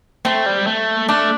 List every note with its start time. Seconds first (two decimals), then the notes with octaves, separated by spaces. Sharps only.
0.25 A3 C4
0.46 G3
0.67 A3
1.08 A3 D4